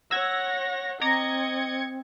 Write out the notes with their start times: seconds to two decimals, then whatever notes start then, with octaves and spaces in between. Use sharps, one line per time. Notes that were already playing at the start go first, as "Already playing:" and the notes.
0.11 C#5 F#5 E6 G#6 A#6
1.01 C4 D#5 A#5 D6 G#6 A#6 C#7